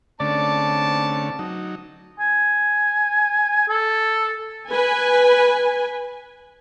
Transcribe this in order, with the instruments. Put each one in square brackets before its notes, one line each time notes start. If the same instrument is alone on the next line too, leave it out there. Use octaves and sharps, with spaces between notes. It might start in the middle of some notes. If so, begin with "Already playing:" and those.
[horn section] G#2 C4 A5 [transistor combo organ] D3 A3 C#4 [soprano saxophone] D5
[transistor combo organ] F#3 D#4
[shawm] G#5
A4
[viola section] B4 G#5